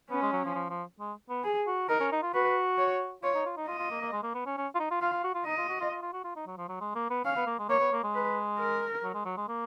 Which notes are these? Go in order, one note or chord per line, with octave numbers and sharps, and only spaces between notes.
B3 C#4
G#3
F#3
F3
F3
F3
G#3
B3
G#4
F#4
D#4 A#4
C#4
D#4
F4
F#4 B4
C#5
F4 C#5
D#4
F4
D#4
F4 D#5
F4
A#3
A#3
G#3
A#3
B3
C#4
C#4
F4
D#4
F4
F4 F5
F4
F#4
F4
D#4 D#5
F4
F#4
F4
F4
F4
F#4
F4
D#4
F#3
F3
F#3
G#3
A#3
B3
C#4 F5
B3
A#3
G#3
A#3 C#5
B3
A#3
G#3
B4
A#4
F#3
G#3
F#3
G#3
A#3